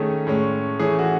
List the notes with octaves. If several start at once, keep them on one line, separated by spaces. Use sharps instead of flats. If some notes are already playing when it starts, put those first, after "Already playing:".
Already playing: D#3 A3 C#4 G#4
A2 G#3 C#4
E3 A3 C#4 G#4
F#4